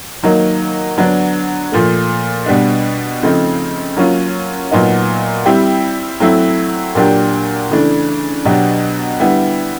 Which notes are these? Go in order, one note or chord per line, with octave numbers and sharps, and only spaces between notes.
D#3 F#3 A#3 D#4
D3 F#3 B3 D4
A#2 F3 A3
B2 G3 B3 D4
C#3 F3 A3 C4 D#4
F#3 A#3 C#4 F4
A#2 F#3 B3 D#4
G3 C4 E4 G4
F#3 A3 C4 E4
A#2 F#3 A#3 D4 G4
C#3 E3 A3 D4
B2 F#3 B3 D4 G4
D3 G3 B3 E4